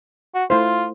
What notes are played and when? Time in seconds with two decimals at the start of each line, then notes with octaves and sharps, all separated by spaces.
0.35 F#4
0.50 A3 E4 F4 C5